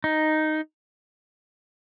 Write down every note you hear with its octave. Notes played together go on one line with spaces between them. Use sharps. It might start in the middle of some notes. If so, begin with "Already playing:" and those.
D#4